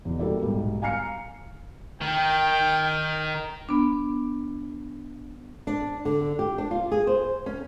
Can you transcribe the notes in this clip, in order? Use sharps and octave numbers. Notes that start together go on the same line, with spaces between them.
E2 B2
G3 A#3 F#4 A4 D5
B1 G#2 G3
F5 G#5 A#5 F6 C7 C#7
D#3 G5
B3 D4
D4
D3
G4
D4
F4
G#4
C5
C#4